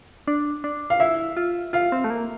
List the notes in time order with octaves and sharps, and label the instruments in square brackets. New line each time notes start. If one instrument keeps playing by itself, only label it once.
[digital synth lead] D4
D4
[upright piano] F5
[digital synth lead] E4 [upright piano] E5
[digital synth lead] F4
[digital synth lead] F4 [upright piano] F5
[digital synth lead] C4
A3
A#3